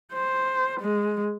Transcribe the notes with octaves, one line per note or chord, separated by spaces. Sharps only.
C5
G#3